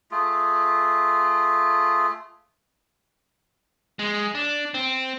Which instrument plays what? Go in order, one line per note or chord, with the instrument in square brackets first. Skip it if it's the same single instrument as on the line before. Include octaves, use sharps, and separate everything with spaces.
[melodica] A3 F4 G#4
[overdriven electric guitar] G#3
D4
C4